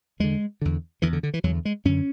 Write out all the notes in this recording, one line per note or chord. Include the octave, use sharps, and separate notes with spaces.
E2 D3 G#3
E2 D3
E2 D3 E3
D3
D3
E3
E2 D3 F#3
G#3
F#2 D3 C#4